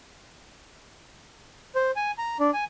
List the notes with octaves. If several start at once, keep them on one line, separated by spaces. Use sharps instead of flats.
C5
G#5
A#5
D4
G#5